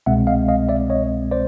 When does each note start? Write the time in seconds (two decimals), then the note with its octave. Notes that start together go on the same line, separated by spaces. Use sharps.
0.06 C2 B2 G#3 C4 E5 F#5
0.27 D#5 F5
0.48 D#5 F5
0.69 D5 E5
0.90 C#5 D#5
1.31 C5 D5